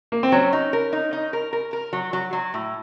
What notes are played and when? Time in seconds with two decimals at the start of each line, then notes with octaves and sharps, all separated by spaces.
0.12 A#3
0.23 C4
0.32 F#3 C#4
0.53 D#4
0.73 A#4
0.93 D#4
1.13 D#4
1.33 A#4
1.53 A#4
1.73 A#4
1.93 F#3
2.13 F#3
2.33 F#3
2.54 A2